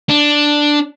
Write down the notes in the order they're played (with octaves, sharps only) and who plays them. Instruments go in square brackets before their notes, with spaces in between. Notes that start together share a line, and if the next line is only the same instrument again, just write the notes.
[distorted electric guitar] D4